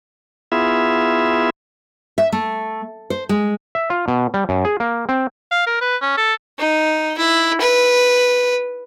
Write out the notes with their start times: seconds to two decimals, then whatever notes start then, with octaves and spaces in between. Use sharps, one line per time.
0.52 B3 E4 F4 G#4 E5
2.18 E5
2.32 A3
3.10 C5
3.29 G#3
3.75 E5
3.90 F4
4.08 B2
4.34 G3
4.49 F#2
4.65 G#4
4.80 A#3
5.09 C4
5.51 F5
5.67 A#4
5.81 B4
6.01 C#4
6.17 A4
6.59 D#4
7.18 E4
7.61 B4